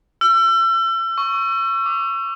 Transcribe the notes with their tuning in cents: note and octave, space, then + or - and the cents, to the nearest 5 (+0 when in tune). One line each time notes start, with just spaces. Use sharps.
E6 +35
C#6 +0
D6 +15